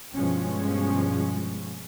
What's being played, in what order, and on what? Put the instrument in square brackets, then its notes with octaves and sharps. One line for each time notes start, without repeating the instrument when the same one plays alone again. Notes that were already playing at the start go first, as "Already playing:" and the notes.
[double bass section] G2 B2 F3 G#3 C#4